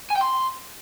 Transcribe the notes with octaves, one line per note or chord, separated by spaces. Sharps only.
G#5
G5
C6